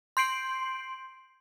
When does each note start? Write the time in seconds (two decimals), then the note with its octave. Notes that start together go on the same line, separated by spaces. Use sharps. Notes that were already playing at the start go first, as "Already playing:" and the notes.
0.17 C6 G6 C7 D7 F#7